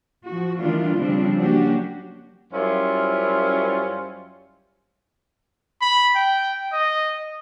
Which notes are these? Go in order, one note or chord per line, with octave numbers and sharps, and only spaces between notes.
F3 F#4
D#3 E3 G3 A3 D4 F4
C#3 F3 G3 C4 D4
F#3 A#3 C#4 D4 F#4 G4
F#2 G3 C#4 E4 F4 C5
B5
G5
D#5